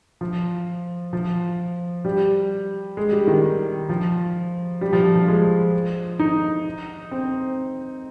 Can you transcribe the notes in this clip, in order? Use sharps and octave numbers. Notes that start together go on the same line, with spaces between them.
F3
F3
G3
G#3
G3
D#3
F3
G3
F3
F3
G#3
D#4
C4